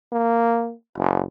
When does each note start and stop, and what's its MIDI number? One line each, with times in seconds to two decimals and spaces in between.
0.12 0.73 58
0.97 1.23 30